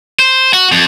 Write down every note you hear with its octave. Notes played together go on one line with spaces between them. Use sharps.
C5
F#4
F2